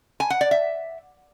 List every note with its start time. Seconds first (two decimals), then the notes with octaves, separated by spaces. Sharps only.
0.20 G#5
0.30 F#5
0.41 D5
0.51 E5